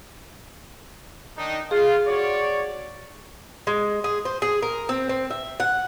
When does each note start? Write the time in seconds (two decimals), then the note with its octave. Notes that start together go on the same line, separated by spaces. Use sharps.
1.37 D#3 D4 D#4
1.71 F4 G#4
2.06 F#4 C#5 D5
3.67 G#3
4.04 G#4
4.25 C5
4.42 G#4
4.62 A#4
4.89 C4
5.09 C4
5.30 E5
5.60 F#5